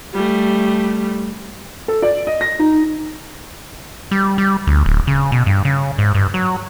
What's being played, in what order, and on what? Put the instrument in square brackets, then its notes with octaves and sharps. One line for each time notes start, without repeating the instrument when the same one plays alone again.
[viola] G3 A3
[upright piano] A4
D5
D#5
A#6
D#4
[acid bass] G3
G3
D2
D1
C#3
B2
G2
C#3
G#2
G2
F#3